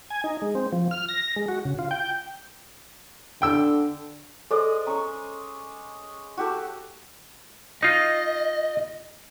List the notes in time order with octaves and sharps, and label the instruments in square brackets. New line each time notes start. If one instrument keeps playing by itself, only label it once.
[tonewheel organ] G#5
D#4
G#3
C4
F3
F6
A#6
G#3
F#4
C#3
F4
G5
[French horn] D3 [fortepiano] G5 E6
[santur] G#3 D5 D#5 [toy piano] A4 C5
[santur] C#4 C#6 [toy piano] A#5
[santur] F#4 G4 A4
[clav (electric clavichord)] D#4 F4 [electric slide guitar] D#5